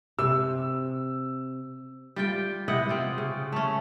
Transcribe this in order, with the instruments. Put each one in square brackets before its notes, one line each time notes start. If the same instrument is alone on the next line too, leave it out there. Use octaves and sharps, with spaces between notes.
[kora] C3 [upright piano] E6
[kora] G3 F4 G5
C3 E4 D#5 F#5
C4 F4
C#3
A3 C#4